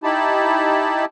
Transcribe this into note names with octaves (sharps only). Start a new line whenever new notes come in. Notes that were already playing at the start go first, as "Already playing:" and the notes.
D#4 E4 G4 A5 B5